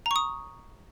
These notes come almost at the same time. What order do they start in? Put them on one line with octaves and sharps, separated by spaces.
A#5 C#6 D#6